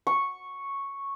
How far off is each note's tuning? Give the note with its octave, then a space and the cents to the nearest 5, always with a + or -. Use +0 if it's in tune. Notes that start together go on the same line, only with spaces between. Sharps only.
C#6 -5